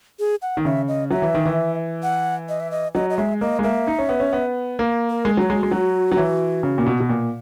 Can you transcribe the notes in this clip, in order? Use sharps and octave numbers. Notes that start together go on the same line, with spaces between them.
G#4
F#5
D#3
C#3 E5
D#5
F#3 E5
E3
D#3
E3
F#5
D#5
E5
D#5
F#3 D#5
D#5
G#3 E5
A#3 D#5
G#3
A#3 E5
D#4
C#4
B3
C#4
B3
A#3
A#4
G#3
F#3 F#4
G#3
G#3
F#3
F#3
E3
C#3
A#2
B2
B2
A#2